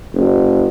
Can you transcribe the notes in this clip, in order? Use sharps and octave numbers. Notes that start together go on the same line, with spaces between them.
F#1